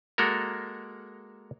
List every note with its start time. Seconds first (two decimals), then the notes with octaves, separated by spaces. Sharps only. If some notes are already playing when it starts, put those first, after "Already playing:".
0.18 G#3 A#3 F#4 A4 A#4